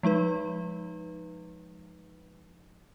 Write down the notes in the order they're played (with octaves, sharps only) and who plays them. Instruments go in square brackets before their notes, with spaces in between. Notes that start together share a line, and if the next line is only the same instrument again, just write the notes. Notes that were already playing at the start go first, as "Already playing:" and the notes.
[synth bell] F3 G#3 D#4 B4